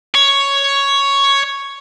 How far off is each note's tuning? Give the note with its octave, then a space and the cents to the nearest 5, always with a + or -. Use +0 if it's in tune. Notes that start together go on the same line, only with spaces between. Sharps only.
C#5 +5